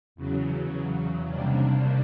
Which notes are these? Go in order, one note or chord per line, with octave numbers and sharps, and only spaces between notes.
E2 C#3 F#3
C3 D#3 G3 A#3 D4